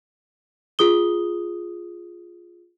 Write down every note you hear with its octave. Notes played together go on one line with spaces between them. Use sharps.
F4 G#4 D#6 G7